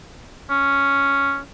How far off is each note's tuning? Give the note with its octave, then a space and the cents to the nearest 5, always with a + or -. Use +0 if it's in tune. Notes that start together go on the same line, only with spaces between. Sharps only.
C#4 +5